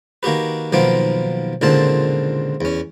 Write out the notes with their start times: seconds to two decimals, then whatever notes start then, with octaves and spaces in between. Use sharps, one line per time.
0.23 D#3 A#3 F#4 G4 B4
0.72 B1 D#3 F3 A#3 B3 D6
1.61 C#2 A#2 D3 D#3 C4 A5
2.61 E2 C#4